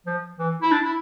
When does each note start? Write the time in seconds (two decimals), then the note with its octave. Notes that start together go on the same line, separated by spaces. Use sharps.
0.07 F3
0.39 E3
0.62 E4
0.72 D4
0.85 E4